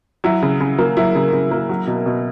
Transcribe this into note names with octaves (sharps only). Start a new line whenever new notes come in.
F#3 E4
C#3
C#3
A#3
F#3 E4
C#3
C#3
A#3
F#3
B2
B2